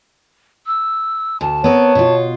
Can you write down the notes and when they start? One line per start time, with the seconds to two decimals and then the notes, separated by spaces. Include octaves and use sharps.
0.67 E6
1.41 D2 A5
1.64 B3 C4 A#4 C#5
1.95 B2 F4